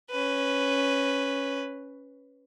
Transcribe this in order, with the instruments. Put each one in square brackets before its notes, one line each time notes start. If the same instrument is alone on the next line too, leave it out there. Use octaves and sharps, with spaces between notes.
[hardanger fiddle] C#4 B4